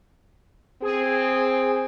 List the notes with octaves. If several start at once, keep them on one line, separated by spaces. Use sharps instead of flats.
C4 G#4